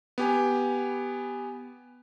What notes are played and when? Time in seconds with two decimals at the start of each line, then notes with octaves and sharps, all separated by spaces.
0.18 B3 G4 G#5